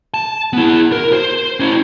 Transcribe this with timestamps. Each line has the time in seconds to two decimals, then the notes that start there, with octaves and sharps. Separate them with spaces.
0.14 A5
0.53 B3 E4
0.92 A#4
1.13 C5
1.60 C#4 E4